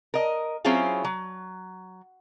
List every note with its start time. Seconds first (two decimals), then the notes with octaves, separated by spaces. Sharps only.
0.14 A#4 D#5
0.65 F#3 C4 C#4 E4 F4 G#4
1.04 F#3